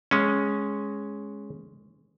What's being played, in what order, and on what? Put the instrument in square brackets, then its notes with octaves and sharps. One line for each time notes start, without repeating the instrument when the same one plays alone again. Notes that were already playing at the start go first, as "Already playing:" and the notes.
[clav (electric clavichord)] G#3 C#4